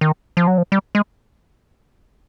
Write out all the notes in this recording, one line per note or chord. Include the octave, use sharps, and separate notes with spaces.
D#3
F3
F#3
F3
G3
G#3